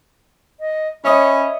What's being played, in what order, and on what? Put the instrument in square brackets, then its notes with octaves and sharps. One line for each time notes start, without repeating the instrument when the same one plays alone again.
[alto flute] D#5
[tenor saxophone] C#4 [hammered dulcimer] C#5 D#5 E5 [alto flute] B5